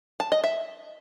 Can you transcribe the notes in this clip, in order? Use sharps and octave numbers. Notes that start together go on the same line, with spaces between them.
A5
D#5
E5